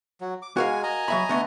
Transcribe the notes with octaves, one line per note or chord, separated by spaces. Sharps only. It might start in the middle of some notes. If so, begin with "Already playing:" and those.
F#3
D6
G#3 F#4 A#4 F5 G#5
D#5 G#5 A#5
F#3 E5 B5
D3 A3 B3